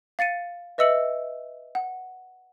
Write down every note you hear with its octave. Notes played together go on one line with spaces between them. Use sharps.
F5 A6 C#7 D#7
B4 D#5 E5 E6 C#7 F#7
F#5